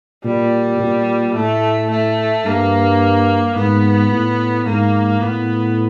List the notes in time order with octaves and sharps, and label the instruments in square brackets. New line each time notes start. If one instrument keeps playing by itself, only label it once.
[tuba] A#2 [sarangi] G3
[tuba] A#2
[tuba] A2 [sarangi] A3
[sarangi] A3
[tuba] G2 [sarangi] A#3
[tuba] G#2 [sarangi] B3
[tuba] A2
[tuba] G#2 [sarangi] A#3
[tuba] A2 [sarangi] B3